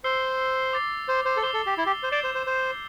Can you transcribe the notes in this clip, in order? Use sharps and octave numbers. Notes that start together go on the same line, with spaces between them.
C5 E6 C7 G7
D6 A6 C7
C5
C5
A4
C5 D6 C7 E7 G7
A4
G4
E4
G4
C5
D5 G6 C7 E7 G7
C5
C5
C5